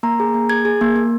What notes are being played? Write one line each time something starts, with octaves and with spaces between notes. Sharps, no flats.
A#3 A#5
G#4
A#3
G#4 G#6
G#4
A#3
A#3